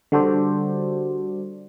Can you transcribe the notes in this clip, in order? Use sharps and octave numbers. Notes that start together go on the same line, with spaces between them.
D3 G3 F#4 A4 C5 D5